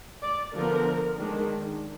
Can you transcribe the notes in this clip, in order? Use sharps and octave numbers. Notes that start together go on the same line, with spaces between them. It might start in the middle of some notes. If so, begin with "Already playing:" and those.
D5
D3 F3 B3 A#4
D#3 G#3 D4